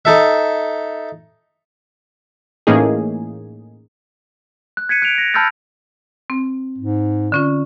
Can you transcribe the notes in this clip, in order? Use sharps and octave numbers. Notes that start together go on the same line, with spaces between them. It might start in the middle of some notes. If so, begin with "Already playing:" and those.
D#4 A4 E5
A2 E3 A#3 C#4 D#4 G#4
F#6
G#6 B6 C#7 D#7
F#6 D7 F7
A#6
A5 B5 E6 F6 G6 A6
C4
G#2
D3 C#4 F4